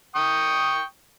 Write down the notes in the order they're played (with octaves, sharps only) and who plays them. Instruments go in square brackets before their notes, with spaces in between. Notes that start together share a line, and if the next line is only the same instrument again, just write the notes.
[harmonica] G5 C#6 D#6